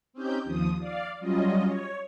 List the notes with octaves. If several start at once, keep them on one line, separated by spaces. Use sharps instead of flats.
C4 C#4 D#4 G4 G6
D#2 F3 D#6
D5 F5
F#3 G3 C#4 F4 D#5
C#5